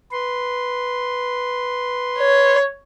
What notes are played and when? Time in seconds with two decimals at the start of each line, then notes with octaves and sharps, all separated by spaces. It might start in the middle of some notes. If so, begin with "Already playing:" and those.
0.12 B4 C6
2.18 C#5